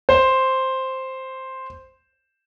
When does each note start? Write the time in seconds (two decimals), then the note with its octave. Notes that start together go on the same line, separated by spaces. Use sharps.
0.09 C5